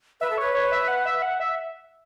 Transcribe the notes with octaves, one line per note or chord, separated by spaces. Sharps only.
B4 E5
A4
B4 C#5
C#5
E5
F#5
E5
F#5
E5